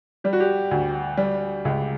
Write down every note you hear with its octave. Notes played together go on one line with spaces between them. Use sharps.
G3 G4
F#4
G4
D2
G3
C#2